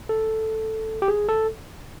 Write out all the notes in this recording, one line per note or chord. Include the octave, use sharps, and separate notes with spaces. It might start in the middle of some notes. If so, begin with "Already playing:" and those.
A4
G4
G#4
A4